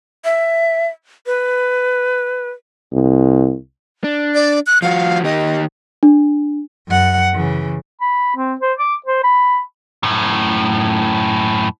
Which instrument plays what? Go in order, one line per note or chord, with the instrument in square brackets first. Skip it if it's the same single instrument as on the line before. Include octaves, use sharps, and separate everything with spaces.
[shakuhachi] E5
B4
[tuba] C2
[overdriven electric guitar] D4
[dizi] D5
F#6
[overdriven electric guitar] F3 F#4 [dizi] F5
[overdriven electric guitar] D#3 G4 [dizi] D#5
[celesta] D4
[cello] F#2 F#5
C#3 E3
[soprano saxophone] B5
C4
C5
D6
C5
B5
[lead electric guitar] F#2 A2